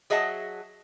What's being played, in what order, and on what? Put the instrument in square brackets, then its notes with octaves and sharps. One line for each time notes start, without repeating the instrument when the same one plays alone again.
[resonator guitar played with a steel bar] F#3 G#4 D#5 E5 F#5 A5